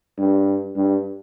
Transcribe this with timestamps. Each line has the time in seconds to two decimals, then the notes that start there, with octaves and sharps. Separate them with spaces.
0.18 G2
0.76 G2